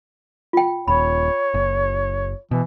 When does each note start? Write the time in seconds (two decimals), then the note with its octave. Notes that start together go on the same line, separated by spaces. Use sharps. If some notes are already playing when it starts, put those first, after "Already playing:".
0.53 F4 G5
0.88 D#1 C#5 B5
1.54 F#1
2.51 B2 E3